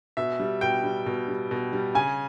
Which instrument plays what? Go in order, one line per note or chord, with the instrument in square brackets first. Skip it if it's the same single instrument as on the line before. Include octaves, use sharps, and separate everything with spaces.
[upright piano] B2 E5
G3
B2 G5
G3
B2
G3
B2
G3
C#3 G#5